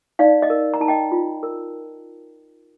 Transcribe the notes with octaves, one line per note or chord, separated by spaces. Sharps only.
D#4 D5 F5
D#5
A#4
A#5
D#4 A5
D#5 G5
F4
A#4